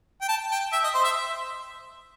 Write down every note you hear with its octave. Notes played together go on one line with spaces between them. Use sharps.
G5
A5
G5
E5
D#5
C5
E5